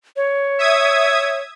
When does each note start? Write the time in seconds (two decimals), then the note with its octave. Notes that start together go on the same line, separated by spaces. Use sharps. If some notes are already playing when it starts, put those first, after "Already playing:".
0.16 C#5
0.59 E5 D#6 G#6